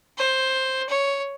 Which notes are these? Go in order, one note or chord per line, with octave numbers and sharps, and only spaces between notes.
C5
C#5